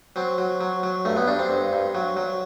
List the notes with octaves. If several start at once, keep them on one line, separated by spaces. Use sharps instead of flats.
F#3 C4
F#3
F#3
F#3
G2 A3
B3
G2 D4
C4
G2
G2
F#3
F#3